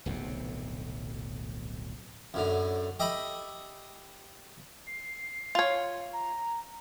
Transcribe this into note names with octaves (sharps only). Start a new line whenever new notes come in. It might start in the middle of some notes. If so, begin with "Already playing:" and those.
D1 B1 F2 C3
F#2 A2 D3
G4 D#5 E5 G5 B5 D#6
C7
F4 C#5
A#5